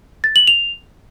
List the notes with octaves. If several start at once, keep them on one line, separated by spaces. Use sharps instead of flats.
A6
F#7
F7